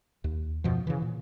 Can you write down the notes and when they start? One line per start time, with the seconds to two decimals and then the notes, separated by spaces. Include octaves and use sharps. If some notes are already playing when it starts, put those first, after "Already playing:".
0.24 D#2
0.64 F#2 B2 F3
0.87 C#3 E3
1.02 A#2